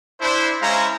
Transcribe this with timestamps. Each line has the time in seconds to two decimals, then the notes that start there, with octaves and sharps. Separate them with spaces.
0.21 D4 E4 C5
0.62 G#3 C#4 E4 C5 F5 A#5